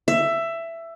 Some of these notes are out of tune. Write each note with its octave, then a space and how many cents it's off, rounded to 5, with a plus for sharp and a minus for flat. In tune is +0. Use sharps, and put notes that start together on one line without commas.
E5 +15